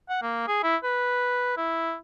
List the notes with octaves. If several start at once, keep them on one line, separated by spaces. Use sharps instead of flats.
F#5
A#3
G#4
E4
B4
E4